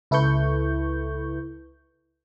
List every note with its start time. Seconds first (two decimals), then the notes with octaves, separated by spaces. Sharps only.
0.11 C#2 E4 A4 B4 C#6 G6